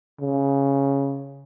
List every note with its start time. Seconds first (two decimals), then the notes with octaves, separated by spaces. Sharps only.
0.21 C#3